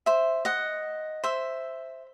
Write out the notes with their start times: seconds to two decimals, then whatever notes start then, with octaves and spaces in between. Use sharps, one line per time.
0.06 C5 E5
0.45 D#5 F#5
1.24 C5 E5